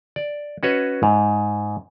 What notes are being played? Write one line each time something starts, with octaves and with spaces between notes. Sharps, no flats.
D5
C#4 F#4 B4 C#5 D#5
G#2